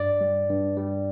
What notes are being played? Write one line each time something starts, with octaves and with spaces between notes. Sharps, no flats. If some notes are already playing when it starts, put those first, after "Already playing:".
Already playing: G2 D5
G3
G2
G3